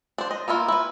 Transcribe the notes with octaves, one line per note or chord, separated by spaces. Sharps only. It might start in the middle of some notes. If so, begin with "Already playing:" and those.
D4 C5
D#5
A#3 B3 E4 F4
E4 B4